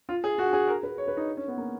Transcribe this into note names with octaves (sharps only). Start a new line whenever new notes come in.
F4
G#4
F#4
G#4
A#4
B4
C#5
B4
D#4
C#4
B3
A#3